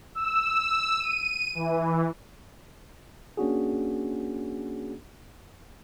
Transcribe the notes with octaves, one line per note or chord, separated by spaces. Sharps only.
E6
D#7
E3
A#3 C#4 D4 F#4 G#4